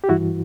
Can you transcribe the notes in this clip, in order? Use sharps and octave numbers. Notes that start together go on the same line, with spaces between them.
G4
G2 E3 E4 F#4